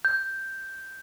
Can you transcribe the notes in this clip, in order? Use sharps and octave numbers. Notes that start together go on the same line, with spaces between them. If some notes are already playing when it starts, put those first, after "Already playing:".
G6